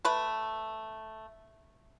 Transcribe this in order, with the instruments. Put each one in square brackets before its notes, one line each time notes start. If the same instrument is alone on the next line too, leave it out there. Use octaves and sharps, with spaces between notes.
[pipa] A3 B4